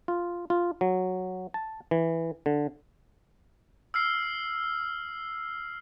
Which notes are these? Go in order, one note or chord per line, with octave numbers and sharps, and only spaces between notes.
F4
F4
F#3
A5
E3
D3
E6 F6 C7